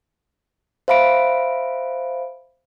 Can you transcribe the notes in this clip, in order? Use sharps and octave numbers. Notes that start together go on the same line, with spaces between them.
C5 E5 F5 B5 D7